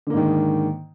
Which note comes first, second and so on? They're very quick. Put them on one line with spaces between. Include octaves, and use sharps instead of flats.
D3 A#3 G#2 D#3